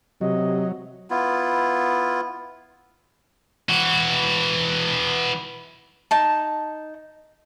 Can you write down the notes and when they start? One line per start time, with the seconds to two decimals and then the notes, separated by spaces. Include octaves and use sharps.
0.21 C3 F#3 D#5
1.10 B3 E4 F4
3.69 E3 F#4
6.11 D#4 A5